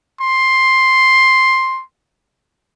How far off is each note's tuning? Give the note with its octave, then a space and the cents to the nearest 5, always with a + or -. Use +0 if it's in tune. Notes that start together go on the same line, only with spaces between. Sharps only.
C6 +10